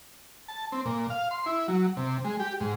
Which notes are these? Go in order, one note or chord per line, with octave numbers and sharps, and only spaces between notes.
A5
C4
A#2
F5
C6
E4
F#3
C3
G#3
G4
G#2